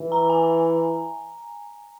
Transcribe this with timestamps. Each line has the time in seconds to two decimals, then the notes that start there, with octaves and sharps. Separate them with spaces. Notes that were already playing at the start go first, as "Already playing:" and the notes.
Already playing: E3
0.12 A#5
0.30 G#5